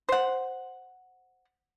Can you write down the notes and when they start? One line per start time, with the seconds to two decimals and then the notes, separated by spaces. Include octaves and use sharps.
0.09 C5 F#5